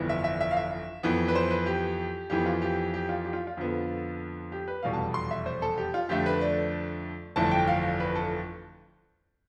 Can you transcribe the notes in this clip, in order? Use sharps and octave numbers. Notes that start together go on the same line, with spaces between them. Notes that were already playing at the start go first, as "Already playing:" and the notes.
Already playing: G1 F2 E3 B3
E5
E5
E5
F5
E5
F2 E3 B3
B4
C5
B4
G4
F2 E3 B3 G4
F4
G4
G4
F4
G4
F4
F4
F2 D3 F3 B3
G4
B4
F1 E2 B2 G3 F5
A5
C6
E5
C5
A4
G4
F4
F2 D3 A3 G4
B4
D5
G1 F2 E3 A3 A5
G5
F5
B4
A4